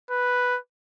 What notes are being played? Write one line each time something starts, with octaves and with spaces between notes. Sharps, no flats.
B4